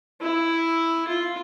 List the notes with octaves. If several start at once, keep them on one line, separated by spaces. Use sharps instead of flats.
E4
F4